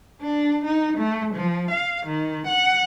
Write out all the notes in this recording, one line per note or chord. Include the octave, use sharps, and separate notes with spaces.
D4
D#4
A3
F3
F5
D#3
F#5